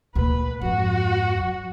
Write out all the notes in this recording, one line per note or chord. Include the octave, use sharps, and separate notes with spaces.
D2 A#2 B4
F2 G#2 F#4
F#3